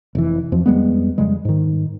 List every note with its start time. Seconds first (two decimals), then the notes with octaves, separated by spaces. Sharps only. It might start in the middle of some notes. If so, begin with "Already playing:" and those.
0.15 F1 E3
0.52 F2 F3 F#3
0.66 F2 G3 G#3 B3
1.18 F2 C#3 G3 G#3
1.45 G#2 D#3